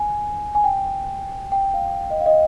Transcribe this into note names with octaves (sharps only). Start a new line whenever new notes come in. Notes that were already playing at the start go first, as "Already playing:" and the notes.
Already playing: G#5
G#5
G5
G5
F5
D#5
F5
D#5